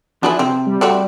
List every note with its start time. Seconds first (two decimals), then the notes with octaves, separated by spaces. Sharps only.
0.23 F3 D4 E4 F#4 G#4 B4
0.39 C3 C4
0.66 G3
0.81 A3 C4 F#4 D5